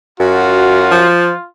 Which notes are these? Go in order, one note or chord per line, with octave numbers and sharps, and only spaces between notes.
F#2 F4 F#4
F3